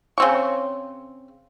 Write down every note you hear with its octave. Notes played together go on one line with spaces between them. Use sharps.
C#3 C4 C#6